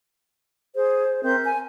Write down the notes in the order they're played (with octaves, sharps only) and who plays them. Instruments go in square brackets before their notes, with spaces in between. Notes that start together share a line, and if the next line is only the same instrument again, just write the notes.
[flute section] G#4 [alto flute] C5
[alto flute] C4 [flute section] A#4 E5 G6
[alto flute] G#5